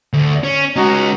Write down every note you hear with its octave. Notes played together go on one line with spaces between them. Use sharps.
D2
C#4
G#3 C#4 D#4 F#4